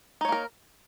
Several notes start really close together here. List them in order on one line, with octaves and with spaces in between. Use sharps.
D#4 C#5 A#3 A#4